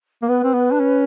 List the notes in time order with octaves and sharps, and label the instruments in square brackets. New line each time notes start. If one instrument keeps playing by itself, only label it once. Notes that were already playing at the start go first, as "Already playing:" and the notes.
[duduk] A#3
[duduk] B3 [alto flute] B4
[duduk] C4
B3
D4
C#4